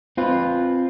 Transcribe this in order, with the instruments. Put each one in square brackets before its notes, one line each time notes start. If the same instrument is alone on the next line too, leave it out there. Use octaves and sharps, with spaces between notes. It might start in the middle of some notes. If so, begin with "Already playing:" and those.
[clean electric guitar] C4 F4 B4